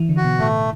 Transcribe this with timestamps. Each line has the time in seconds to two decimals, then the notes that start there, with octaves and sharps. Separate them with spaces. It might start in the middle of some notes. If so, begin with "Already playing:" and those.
Already playing: E3
0.09 D3
0.17 F#4
0.24 B2
0.39 A2 A3